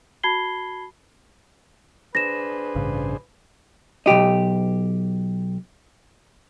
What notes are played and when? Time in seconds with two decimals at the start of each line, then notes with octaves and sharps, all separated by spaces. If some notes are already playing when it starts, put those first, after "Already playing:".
0.23 F#4 A5 B5 G#6 C7 G7
2.15 D4 G#4 B4 C5 A#6 E7
2.75 A1 G2 C#3
4.06 B1 F2 G4 D#5